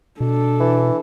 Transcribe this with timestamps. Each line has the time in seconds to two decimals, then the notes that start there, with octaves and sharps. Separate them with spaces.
0.20 B2 D4 A4
0.60 E3